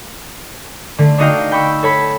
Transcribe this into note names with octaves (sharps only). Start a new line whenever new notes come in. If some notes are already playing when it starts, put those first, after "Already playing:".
D3 A3
D4 D#4 F#4 D#5 F5 G5
G5 B5 C#6 E6
A4 C#5 B5